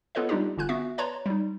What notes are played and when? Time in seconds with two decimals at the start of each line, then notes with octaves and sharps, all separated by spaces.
0.15 B3 F4 A4 B4 C#5 D#5
0.29 G3 D4 D#4 F4 G4
0.57 G1 D3 F4 G#5 F#6
0.69 B3 F#4 E5
0.98 B4 C#5 D5 A5 A#5 C6
1.26 G3 D#4